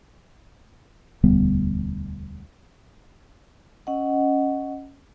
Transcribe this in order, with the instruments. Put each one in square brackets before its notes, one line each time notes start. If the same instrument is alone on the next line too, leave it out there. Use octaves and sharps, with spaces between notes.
[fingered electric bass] E1 D2 G3 B3
[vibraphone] C#4 D#5 F#5